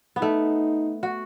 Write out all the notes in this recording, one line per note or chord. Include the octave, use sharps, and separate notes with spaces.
B3
A3 D#4
F#4